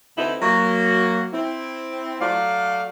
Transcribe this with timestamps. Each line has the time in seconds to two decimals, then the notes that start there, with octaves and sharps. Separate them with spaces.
0.17 D2 C4 D#4 E4 A4 B4
0.41 F#3 A#3 F#4
1.33 C4 E4
2.21 F#3 A3 D5 F5